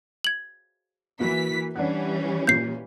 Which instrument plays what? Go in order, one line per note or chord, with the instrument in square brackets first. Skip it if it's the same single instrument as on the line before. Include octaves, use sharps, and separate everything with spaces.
[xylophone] G#6 F#7
[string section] E3 B6 [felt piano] A#3 F#4
[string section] E3 G3 C#4 [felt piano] D4 F#5
[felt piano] A#2 [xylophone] G6 C7